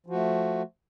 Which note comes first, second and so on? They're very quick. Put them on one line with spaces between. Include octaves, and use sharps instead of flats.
F3 F#4 A3